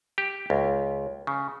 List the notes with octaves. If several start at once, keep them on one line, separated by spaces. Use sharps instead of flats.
G4
C#2
C#3